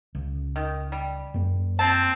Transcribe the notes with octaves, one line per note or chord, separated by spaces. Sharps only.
C#2
D#3
G3
F#2 A#3
C4 A5